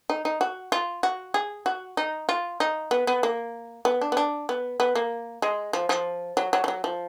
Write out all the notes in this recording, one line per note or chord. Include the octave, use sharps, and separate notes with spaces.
D#4
D#4
F#4
F4
F#4
G#4
F#4
D#4
F4
D#4
B3
B3
A#3
B3
D4
B3
D4
B3
B3
A#3
G#3
F3
F3
F#3
F#3
F3
F#3
F3